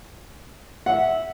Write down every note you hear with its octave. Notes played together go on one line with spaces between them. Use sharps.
E5 F#5